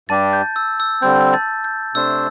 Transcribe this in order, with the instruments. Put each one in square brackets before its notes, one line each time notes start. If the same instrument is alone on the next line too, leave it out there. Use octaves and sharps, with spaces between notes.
[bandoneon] G2 G3 D4 G4 [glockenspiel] A5 A6
[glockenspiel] G6
E6
E6
[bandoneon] D3 G3 C4 [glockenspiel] G6
[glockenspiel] A5 A6
G6
[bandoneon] C3 A3 D4 C5 [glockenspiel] E6